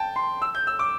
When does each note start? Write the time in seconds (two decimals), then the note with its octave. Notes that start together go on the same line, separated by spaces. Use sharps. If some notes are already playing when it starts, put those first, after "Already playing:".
Already playing: G5 A5
0.16 C6
0.42 E6
0.55 G6
0.67 E6
0.79 D6